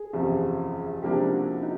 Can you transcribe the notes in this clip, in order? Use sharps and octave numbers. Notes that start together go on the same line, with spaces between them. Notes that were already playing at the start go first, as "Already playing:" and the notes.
Already playing: G#4
F#1 E2 C3 F3
C#2 C3 F3 A#3 D4 G4
F#4
D#4